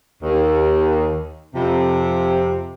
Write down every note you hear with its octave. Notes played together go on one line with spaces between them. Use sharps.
D#2
F2 C3